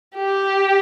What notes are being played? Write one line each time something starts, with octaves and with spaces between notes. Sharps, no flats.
G4